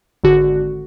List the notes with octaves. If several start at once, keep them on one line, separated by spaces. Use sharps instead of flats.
G#1 D3 F#4